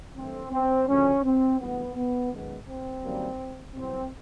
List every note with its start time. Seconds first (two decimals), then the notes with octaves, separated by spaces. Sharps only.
0.16 G2 E3 A3 C4
0.52 C4
0.88 D2 C#3 F3 A3 C#4
1.24 C4
1.60 G#1 G2 E3 A3 B3
1.96 B3
2.31 F#2 D#3 G#3 B3
2.67 C4
3.03 F#2 D#3 G3 A#3
3.75 C2 B2 F#3 C4